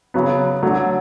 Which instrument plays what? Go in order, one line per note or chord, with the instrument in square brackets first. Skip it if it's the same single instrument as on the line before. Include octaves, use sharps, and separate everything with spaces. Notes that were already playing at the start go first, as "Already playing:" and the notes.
[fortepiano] C#3 F#3 B3
D3 F#3 A3